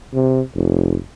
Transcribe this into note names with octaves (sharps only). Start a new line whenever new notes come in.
C3
F1